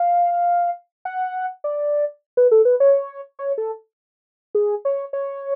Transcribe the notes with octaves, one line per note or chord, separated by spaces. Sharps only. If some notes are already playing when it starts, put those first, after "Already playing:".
Already playing: F5
F#5
D5
B4
A4
B4
C#5
C#5
A4
G#4
C#5
C#5